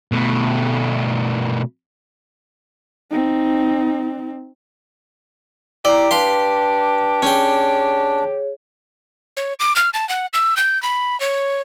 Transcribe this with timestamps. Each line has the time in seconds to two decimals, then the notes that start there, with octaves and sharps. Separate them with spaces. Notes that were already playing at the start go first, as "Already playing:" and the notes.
0.12 B2 A3
3.11 C4 D#4
5.85 E4 G4 D5 A#5
6.11 D4 B4 F5 C6
7.22 C#4 G#4 C#5 G5
9.37 C#5
9.60 D6
9.76 F6
9.94 A5
10.09 F#5
10.34 E6
10.57 G6
10.83 B5
11.20 C#5